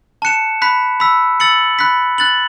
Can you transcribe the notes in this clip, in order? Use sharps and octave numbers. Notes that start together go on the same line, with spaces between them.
A5 F#6 C#7 E7
B5 F#6 B6
B5 E6 B6
E6 A6 C#7 F#7
B5 F#6 B6
F#6 A6 F#7